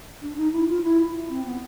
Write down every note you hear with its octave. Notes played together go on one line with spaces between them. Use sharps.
D4
D#4
E4
F4
E4
C4
B3